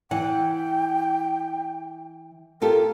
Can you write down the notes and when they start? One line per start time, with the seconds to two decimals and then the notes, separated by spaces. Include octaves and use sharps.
0.11 E3 F#5 G5
2.62 F4 G4 A4 A#4